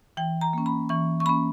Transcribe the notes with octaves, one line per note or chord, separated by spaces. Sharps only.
E3 G5
A#5
A#3 C#4
B5
E3 C#6
C#6
A#3 C#4 B5